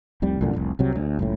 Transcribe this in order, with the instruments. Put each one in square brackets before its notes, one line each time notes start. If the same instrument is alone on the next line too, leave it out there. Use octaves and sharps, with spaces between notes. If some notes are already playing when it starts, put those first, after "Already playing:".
[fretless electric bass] F1 C2 G3
C2 F#2 A#2 D3
F1 C2
C2 C3 F#3
D2
F#1 C#2 A2